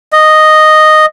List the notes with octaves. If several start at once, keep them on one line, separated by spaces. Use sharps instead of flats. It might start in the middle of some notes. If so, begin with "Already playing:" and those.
D#5